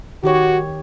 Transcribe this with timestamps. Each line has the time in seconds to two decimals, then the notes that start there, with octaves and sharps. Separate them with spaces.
0.24 D#3 F#4 G4 C#5